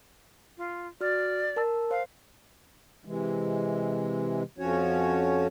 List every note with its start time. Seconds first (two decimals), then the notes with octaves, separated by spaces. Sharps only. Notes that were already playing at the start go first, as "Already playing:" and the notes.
0.57 F4
1.01 F#4 D5 F6
1.56 A#4 A5 E6
1.91 C5 F5
3.05 C3 E3 G#3
4.58 F2 F3 C#4 F#4 C#5